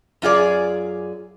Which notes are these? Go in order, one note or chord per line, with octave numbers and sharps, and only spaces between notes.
F#2 F4 G#4 D5